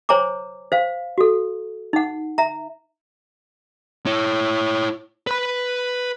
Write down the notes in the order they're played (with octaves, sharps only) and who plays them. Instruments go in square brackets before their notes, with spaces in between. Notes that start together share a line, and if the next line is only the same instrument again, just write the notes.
[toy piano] C5 C#5 G#5 A#5 D6
C5 F5
F#4 A4
D#4 F#5
E5 A#5
[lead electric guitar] E4 C#5
B4 B5